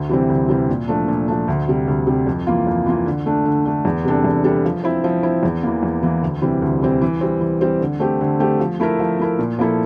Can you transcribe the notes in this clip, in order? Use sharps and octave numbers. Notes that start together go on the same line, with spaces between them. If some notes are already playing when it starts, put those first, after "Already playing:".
Already playing: D2
C3 E3 G3 C4
D2
C3 E3 G3 C4
A#2
F3 A3 D4
A#2
F3 A3 D4
D2
C3 G3
D2
C3 G3
F2
E3 A#3 F4
F2
E3 A#3 F4
D3
A3 D4
D3
A3 D4
E2
C3 G3 D4 A4
E2
C3 G3 D4 A4
F3
C4 E4
F3
C4 E4
E2
E3 A#3
E2
E3 A#3
D2
C3 E3 G3 C4
D2
C3 E3 G3 C4
E3
G3 C4
E3
G3 C4
D3
A3 C4 G4
D3
A3 C4 G4
F3
A3 E4 A#4
F3
A3 E4 A#4
A#2
F3 A#3 E4 A4